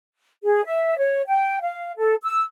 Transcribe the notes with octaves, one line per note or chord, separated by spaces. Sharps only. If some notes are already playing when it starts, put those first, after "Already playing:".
G#4
E5
C#5
G5
F5
A4
E6